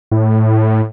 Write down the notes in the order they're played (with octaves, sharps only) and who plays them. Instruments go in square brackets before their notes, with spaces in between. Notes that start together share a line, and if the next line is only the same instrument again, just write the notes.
[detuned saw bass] A2